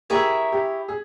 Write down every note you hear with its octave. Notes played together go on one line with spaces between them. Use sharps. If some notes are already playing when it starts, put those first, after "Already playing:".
E4 G4 G#4 A#4 C#5 E5
G4
G#4